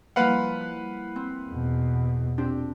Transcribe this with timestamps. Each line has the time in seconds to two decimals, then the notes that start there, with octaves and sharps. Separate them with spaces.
0.16 F3 G3 A#3 E4 B4 F5 F#5 B5
0.61 F#6
1.16 C4
1.49 E2 B2
2.38 A#2 C4 D4 G4